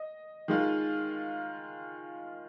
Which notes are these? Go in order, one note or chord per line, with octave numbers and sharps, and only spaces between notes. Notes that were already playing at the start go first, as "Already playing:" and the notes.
Already playing: D#5
D#3 G#3 F4